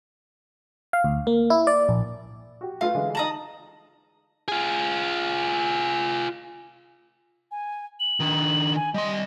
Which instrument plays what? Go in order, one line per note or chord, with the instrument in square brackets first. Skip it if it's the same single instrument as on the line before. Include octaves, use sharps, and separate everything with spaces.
[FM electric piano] F5
D2
A#3
E4
D5
A#1
[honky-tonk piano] F#4 G4
[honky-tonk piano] A3 F4 B4 [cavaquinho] F5
[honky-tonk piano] D3 E3 G#3
[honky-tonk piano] D#4 F#7 [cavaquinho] A5 A#5 D#6
[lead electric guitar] F4 G#4
[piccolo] G#5
F#7
[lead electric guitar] D#3 D4
[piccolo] G#5
[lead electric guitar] G3 C6 [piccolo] D#5